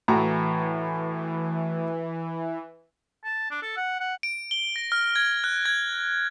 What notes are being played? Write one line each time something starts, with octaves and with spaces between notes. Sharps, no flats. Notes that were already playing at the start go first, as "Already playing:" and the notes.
A2 E3 F#4 A#5
A5
D4
A4
F#5
F#5
D7
G7
A#6
F6
G#6
F#6
G#6